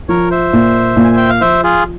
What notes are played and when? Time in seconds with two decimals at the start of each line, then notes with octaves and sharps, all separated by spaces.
0.09 F3 A#4 C#5
0.30 C5 E5
0.53 A#2
0.97 A#2
1.04 G#5
1.17 G5
1.29 F5
1.41 F3 C5 E5
1.63 F4 G#4